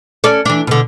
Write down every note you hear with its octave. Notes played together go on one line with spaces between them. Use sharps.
C#4 A4 D5
E3 D4
B2 D3